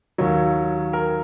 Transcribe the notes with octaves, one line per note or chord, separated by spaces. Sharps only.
D#2 D#3 F#3 C#5
A#4